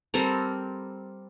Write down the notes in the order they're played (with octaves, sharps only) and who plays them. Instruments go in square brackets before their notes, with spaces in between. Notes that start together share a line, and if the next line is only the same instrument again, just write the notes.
[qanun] G3 C4 A4 A#4